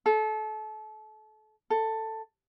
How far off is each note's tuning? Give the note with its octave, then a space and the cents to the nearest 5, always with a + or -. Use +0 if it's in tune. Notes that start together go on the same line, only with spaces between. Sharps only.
A4 -30
A4 +10